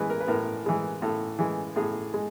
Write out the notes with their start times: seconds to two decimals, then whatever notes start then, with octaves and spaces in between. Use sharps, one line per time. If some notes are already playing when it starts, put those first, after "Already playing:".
Already playing: A2 E3 G#3 B4
0.10 A#4
0.20 B4
0.28 A2 A#4
0.66 E3 G#3
1.02 A2 A4
1.39 E3 G#3
1.76 A2 G#4
2.14 G#3